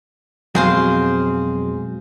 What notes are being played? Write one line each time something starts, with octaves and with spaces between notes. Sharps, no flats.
F2 B2 F#3 G#3 C4 G#4 C5 F5